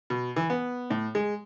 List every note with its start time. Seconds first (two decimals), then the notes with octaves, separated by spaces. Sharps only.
0.10 B2
0.36 E3
0.50 B3
0.90 A2
1.15 G#3